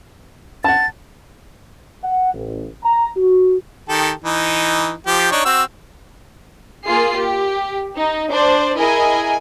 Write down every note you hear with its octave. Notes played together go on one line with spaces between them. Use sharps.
F#5 A5 A6
F#5
A1
A#5
F#4
D#3 G4 A4
E3 D#4
F3 G4
D4 D#4 C#5
C4 F#4 E6
A#3 F4 G#4 C7
G4
D#4
D4 C5 D5
E4 G#4 A#4 D#5 G#5